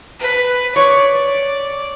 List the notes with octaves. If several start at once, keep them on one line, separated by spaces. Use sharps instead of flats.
B4
C#5 D5